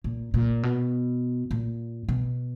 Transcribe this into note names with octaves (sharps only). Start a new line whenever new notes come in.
A#2
A#2
B2
A#2
B2